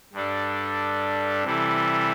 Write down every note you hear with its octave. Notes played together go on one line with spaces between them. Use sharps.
G2 G3 D4 A4
C3 E3 G3 E4 A4